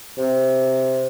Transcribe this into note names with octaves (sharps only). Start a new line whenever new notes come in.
C3